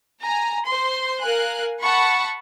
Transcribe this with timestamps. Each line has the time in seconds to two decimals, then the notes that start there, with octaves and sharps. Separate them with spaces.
0.21 G#5 A#5
0.66 C5 C6
1.21 A#4 F5 G#5 F#6
1.80 F#5 A5 B5 C#6